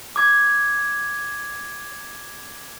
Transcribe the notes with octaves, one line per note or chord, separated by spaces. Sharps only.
D6 G#6